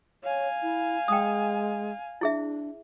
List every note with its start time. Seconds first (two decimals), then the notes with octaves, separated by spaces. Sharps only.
0.24 C#5 F5 G#5
0.62 E4
1.08 G#3 G5 D#6
2.21 D4 E4 G#4 E5